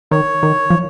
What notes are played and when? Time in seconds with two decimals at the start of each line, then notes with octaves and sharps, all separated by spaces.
0.11 D#3 C#5
0.43 D#3
0.70 F3